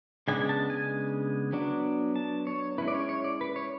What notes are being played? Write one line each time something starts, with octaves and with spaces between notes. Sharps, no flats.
C#3 G#3 B3 D4 G#5
A5
G#5
F#3 B3 D4
A5
C#5
G#3 C#4 E4 B4
D5
C#5
C#5
D5
B4
C#5